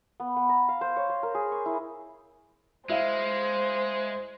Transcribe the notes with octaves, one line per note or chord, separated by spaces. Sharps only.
B3
B3
A#5
F5
C5
C#5
C5
A#4
G#4
C#6
E4
G#3 E4 C5 F5